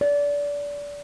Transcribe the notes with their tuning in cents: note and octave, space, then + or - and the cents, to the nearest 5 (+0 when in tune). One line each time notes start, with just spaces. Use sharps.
D5 -25